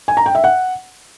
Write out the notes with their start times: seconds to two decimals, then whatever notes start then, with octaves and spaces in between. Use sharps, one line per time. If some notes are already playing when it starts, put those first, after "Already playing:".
0.08 G#5
0.17 A#5
0.26 G5
0.35 E5
0.44 F#5